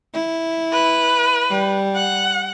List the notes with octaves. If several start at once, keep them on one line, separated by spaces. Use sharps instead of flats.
E4
B4
G3
F#5